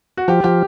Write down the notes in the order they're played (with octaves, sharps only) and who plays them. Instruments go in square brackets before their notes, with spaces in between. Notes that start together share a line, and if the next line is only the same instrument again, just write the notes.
[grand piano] F#4
[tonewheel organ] F3 [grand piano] G4
[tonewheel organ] F3 [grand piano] G4